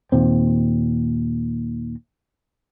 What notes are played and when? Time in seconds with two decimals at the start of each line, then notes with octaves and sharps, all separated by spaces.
0.12 D#2 A#2 C4